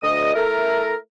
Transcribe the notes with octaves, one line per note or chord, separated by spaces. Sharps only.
D2 D#5 D#6
A3 E4 A4 A#4